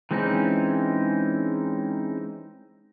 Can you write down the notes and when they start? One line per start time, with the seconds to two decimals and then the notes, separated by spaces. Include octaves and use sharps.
0.11 E3 G#3 C4 C#4 D#4